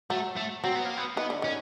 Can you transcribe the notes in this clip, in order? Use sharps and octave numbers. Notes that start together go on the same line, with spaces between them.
F#3 A3
A3
F#3 C4
B3
A#3
B3
D#3 B3
D3
D#3 C#4